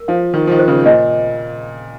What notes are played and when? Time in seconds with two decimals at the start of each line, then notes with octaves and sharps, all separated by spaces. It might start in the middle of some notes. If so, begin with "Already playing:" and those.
Already playing: A#4
0.08 F3 F5
0.34 D#3 F4
0.47 F3
0.51 D#3
0.59 C5
0.68 C#3
0.86 A#2 D#5